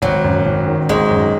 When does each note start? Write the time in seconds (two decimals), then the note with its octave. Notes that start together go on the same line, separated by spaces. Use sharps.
0.02 G#1 F#3
0.24 F#2
0.46 G#1
0.67 D#3
0.89 G#1 G#3
1.10 F#2